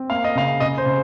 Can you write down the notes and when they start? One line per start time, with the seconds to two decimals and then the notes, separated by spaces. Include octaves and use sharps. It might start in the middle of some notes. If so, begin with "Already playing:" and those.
Already playing: C4
0.10 A#3 F5
0.24 D#5
0.35 C#3 F5
0.60 C#3 D#5
0.78 C5
0.86 C#3